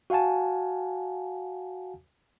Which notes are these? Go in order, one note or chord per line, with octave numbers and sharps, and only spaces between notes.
F#4 F5 F#5 G#5 A5